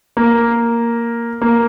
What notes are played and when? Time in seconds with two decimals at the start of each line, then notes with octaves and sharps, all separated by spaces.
0.17 A#3
1.42 A#3